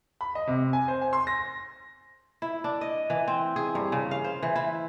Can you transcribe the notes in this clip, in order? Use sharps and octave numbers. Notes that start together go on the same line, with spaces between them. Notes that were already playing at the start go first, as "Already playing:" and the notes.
B5
D#5
C3
G#5
C5
G#5
C6
A#6
E4
D4
D#5
E3
C4
G#4
G2
C#3
F5
C5
E3
E4